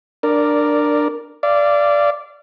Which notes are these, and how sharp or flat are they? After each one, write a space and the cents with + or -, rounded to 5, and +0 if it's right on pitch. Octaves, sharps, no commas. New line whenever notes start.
D4 +15 A#4 +0 D5 +0
D5 -5 F5 -35